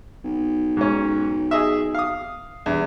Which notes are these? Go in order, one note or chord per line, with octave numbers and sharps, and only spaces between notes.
B1
G#2 C#4
G#4 D#5 E5
F5 D#6
E2 G2